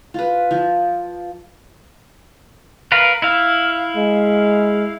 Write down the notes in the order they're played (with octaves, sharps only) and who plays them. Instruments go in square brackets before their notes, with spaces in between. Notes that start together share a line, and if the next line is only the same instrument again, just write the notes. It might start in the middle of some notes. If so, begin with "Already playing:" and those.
[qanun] F4 B4
F3
[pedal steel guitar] A#4 B4 F5
E4 F5
[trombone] G#3